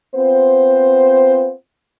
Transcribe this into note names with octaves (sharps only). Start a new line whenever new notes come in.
B3 C4 F4 C5